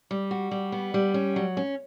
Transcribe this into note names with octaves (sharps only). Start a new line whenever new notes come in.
G3
F#4
G3
B3
G3
C#4
F#3
C#4